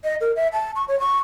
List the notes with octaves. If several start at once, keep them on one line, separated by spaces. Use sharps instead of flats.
D#5
A#4
E5
A5
C#6
C#5
C#6